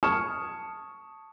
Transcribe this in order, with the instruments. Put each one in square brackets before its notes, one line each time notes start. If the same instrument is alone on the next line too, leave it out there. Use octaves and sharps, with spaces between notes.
[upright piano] A5 C#6 D#6 F6 G#6 E7